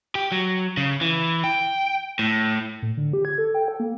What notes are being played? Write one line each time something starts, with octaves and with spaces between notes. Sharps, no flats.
G4
F#3
C#3
E3
G5
A2
A2
D3
G4
G#6
A4
G5
A4
A#3